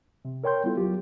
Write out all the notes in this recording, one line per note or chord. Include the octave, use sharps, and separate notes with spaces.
C3
A#4 C#5 G5 C6 G6
G3 B3 E4 F4 A4
C#2 F#3 F4 G4